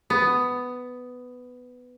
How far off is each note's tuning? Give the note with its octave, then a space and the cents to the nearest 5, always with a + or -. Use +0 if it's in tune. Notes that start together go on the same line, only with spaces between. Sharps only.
B3 +10